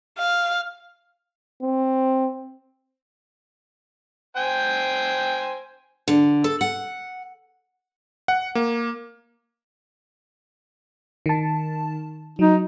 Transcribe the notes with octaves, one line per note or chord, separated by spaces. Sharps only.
F5
C4
C5 G5 G#5
D3
A4
F#5
F#5
A#3
D#3 A5
F#3 D#4